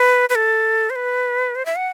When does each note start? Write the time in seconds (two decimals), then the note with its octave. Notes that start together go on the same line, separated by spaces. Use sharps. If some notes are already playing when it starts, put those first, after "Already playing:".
Already playing: B4
0.29 B4
0.35 A4
0.90 C5
0.96 B4
1.55 C5
1.66 E5
1.76 F#5